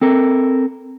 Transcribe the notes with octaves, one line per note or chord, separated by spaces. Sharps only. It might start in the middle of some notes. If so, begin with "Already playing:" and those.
C4 A4 A#4